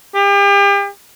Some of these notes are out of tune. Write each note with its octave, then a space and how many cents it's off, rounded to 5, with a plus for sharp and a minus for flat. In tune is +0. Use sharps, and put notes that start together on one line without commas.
G4 +40